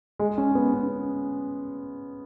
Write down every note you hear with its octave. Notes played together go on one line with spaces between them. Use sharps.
G#3
C#4
B3
C#4